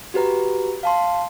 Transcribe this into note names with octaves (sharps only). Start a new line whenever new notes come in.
F#4 G4 B4 A#5
F5 A5 C6